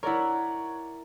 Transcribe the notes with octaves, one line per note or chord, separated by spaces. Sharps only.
E4 A#4 C#5 D5 F#5